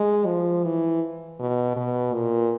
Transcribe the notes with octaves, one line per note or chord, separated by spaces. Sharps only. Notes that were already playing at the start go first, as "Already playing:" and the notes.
Already playing: G#3
F3
E3
B2
B2
A#2